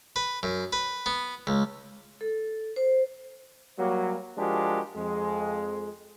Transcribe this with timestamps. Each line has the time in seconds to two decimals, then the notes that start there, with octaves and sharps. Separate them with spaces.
0.16 B4
0.43 F#2
0.73 B4
1.06 B3
1.47 C#2
2.21 A4
2.76 C5
3.79 F#3 G3 A#3
4.38 F3 G#3 D4 F#4 G4 A#4
4.96 F2 G#3